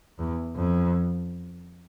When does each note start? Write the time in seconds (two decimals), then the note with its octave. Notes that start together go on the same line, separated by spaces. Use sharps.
0.19 E2
0.56 F2